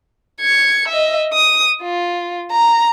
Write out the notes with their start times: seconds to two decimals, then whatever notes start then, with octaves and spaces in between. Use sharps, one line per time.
0.40 G#6 C#7
0.88 D#5 E5
1.34 D#6
1.82 F4
2.51 A#5